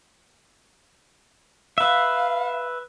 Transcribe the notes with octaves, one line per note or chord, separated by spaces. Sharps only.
B4 E5 F5